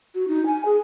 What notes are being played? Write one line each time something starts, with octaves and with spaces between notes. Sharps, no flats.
F#4
D#4
G#5
G#4